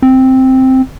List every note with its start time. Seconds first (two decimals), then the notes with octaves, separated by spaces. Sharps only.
0.02 C4